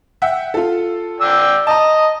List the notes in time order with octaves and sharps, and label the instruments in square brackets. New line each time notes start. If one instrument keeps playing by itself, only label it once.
[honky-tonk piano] E5 F#5 G5
F4 A4
[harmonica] D5 G5 E6
[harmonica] D#5 [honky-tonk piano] A5 A#5